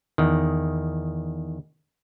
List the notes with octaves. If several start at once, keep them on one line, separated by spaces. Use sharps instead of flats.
E2 D#3